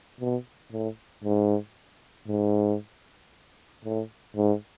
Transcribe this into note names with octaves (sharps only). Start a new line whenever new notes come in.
B2
A2
G#2
G#2
A2
G#2